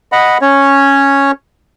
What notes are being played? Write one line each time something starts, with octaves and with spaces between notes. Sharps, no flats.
D#5 F#5 B5
C#4 C#5